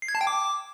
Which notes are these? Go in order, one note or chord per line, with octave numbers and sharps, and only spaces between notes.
C7
G#6
A5
G5
D6